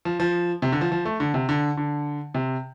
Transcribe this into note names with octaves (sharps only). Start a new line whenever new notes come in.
F3
F3
C3
D3
F3
F3
A3
D3
C3
D3
D3
C3